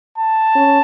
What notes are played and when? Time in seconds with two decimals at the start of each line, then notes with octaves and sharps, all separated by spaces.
0.18 A5
0.54 C#4